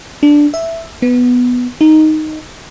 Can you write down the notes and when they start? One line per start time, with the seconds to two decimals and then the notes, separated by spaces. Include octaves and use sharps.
0.23 D4
0.54 E5
1.02 B3
1.81 D#4